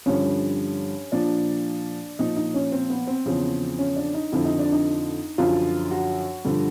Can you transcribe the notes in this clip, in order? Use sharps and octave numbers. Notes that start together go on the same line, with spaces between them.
G2 D3 F3 C#4
A#2 F3 D4
A#2 F3 D#4
D#4
C#4
C4
B3
C4
E2 C#3 F3
C#4
D4
D#4
F2 D3 F3 E4
D#4
D4
D#4
F#2 D3 F3 F4
F#4
G2 D3 F3